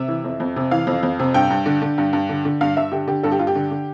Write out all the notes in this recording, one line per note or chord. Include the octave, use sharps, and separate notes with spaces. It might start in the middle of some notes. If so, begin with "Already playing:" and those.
Already playing: C3 E5
E3
F2
F2
C3
E3 F5
F2
F2
C3
G2 G5
G2
D3
D3
G2
G2
D3
D3
G2 F5
G2 E5
D3 G4
D3 G4
G2 A4
G4
G2 F4
G4
D3
D3